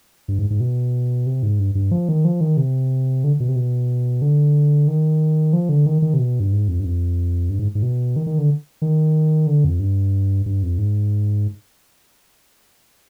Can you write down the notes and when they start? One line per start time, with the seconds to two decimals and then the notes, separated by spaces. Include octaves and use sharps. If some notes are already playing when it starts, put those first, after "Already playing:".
0.28 G2
0.39 G#2
0.50 G#2
0.60 B2
1.26 C3
1.43 G#2
1.59 G2
1.75 G2
1.91 F3
2.09 D#3
2.25 F3
2.41 D#3
2.57 C3
3.24 D3
3.40 B2
3.49 C3
3.56 B2
4.22 D3
4.88 D#3
5.53 F3
5.69 D3
5.86 D#3
6.02 D#3
6.14 C3
6.19 B2
6.40 G2
6.52 G#2
6.68 F2
6.80 G2
6.84 F2
7.50 G2
7.59 G#2
7.75 G#2
7.83 B2
8.16 D#3
8.26 D#3
8.38 D3
8.82 D#3
9.47 D3
9.64 F2
9.80 G2
10.46 G2
10.63 F2
10.78 G#2